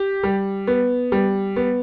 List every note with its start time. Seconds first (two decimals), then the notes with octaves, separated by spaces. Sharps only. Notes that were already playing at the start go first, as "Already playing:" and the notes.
Already playing: G4
0.23 G3
0.67 B3
1.12 G3
1.56 B3